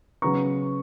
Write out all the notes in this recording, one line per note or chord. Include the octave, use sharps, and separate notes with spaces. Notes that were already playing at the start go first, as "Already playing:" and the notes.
C#3 F#3 B3 A#5 C#6